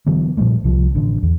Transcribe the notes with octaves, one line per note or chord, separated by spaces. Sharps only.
D3 E3 F#3 B3
A#2 F3 G3 A3
C2 F3
A1 D3
E2